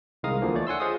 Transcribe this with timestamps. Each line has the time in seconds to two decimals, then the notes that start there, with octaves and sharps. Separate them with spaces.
0.23 C2 D#3 G#3 F5 A#5 D#6
0.42 D2 D3 E3 F3 A#3
0.55 A3 C#5 D5
0.67 F#5 G#5 C6 E6
0.80 F4 G#4 C5 D#5 F5 D#6